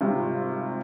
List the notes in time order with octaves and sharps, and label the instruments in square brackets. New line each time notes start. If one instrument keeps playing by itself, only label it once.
[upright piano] G#1 C3 G3 F4